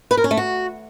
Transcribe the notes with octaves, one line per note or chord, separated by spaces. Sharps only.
B4
A#4
C#4
A3
F#4